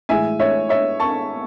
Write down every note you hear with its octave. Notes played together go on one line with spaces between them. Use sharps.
A2 E3 G#3 E5 G#5
C#5 E5
C#5 E5
A5 C#6